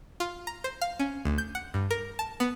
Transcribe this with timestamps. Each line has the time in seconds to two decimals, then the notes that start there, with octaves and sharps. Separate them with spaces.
0.20 F4
0.47 A#5
0.64 C5
0.81 F5
0.99 C#4
1.25 D2
1.38 G6
1.55 F#5
1.74 G2
1.91 A#4
2.19 A5
2.40 B3